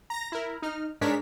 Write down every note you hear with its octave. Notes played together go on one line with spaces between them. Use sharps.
A#5 A#6
E4 A#4
D#4 F6
G#2 G#3 D4 A#4 C#5 B6